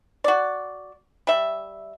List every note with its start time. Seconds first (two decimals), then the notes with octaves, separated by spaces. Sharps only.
0.24 F#4 D5
1.27 G3 E5